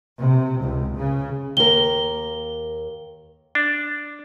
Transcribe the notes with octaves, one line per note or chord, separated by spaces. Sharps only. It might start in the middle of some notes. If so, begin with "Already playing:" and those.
C3
C#2
C#3
D#2 A#4 G7
D4